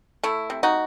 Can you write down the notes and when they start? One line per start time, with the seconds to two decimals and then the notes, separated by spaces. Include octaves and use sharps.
0.23 A3 E4
0.50 C3
0.63 D#4 F#4